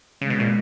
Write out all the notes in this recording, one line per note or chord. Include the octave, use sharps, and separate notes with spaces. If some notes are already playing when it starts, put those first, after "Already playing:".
C#3 G#3
B2
A#2